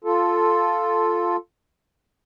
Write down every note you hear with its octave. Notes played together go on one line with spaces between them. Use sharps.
F4 A4